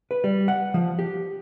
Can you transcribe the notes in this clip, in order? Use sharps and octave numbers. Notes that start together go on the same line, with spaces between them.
B4
G3
F#5
F3
G4